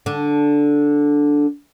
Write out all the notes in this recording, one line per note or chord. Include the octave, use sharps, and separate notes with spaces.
D3 D4